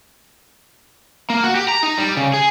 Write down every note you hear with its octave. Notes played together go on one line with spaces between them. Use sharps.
A#3
F#4
G4
A#5
D#4
G3
C#3
G#4